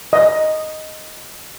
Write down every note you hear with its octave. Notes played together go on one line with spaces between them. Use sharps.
D#5